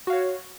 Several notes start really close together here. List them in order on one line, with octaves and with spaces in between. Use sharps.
F#4 F5 C#5